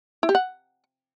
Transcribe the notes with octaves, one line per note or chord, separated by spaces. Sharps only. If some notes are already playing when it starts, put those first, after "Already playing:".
E4
G4
F#5